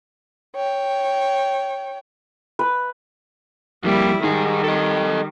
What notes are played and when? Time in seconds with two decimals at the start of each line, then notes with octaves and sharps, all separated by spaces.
0.56 C#5 G5
2.59 B4
3.84 F2 G3 A#3 E4
4.24 D#3 G3 D#4 G#4
4.64 A4 D#5